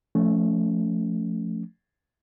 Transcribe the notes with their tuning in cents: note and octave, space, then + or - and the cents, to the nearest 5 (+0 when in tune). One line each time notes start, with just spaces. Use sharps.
F3 +0 A3 +0 C#4 +20